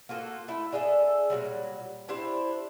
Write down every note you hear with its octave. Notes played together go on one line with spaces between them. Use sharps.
A#3 F4 F#4 A4
A3 E4 A4
D4 G#4 A4 E5
A#2 D3 F#3 G3
D4 E4 G4 C5